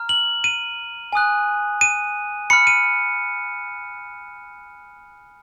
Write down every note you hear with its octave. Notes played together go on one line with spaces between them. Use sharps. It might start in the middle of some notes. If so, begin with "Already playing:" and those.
Already playing: A#5 F6
F#7
D#7
G#5 D#6 F#6
D#7
B5 F6 C#7
D#7